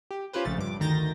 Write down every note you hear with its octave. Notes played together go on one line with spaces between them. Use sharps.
G4
C#4 F4 G4 B4 C5
A#1 C#3 F3 A3 A6
G2 D6
D2 D#3 A#5 G6 A6 A#6